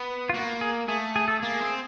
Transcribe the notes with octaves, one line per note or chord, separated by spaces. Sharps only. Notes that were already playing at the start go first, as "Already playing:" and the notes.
Already playing: B3
F4
A#3 F#4
G#4
A3 G#4
G#4
A4
A#3 G#4
C4